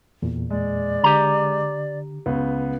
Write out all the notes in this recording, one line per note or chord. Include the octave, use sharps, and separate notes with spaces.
E2 A#2
G#3 D5
D3 G4 A#5
C#2 B3